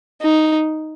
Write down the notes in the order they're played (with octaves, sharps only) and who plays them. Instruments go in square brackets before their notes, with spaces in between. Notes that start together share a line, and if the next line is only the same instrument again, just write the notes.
[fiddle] D#4